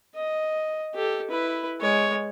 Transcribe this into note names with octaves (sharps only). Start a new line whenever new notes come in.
D#5
G4 A4
E4 B4
G#3 C#5